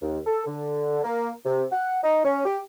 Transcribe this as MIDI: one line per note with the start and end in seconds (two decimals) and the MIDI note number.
0.02 0.19 39
0.26 0.43 69
0.47 1.02 50
1.04 1.30 58
1.45 1.65 48
1.72 1.99 78
2.03 2.25 63
2.25 2.44 61
2.45 2.60 67